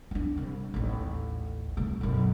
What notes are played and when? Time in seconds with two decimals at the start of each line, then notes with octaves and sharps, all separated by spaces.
0.11 D4 D#4
0.37 C2
0.74 A1 D#2
1.77 C2 A3
2.01 B1 F#2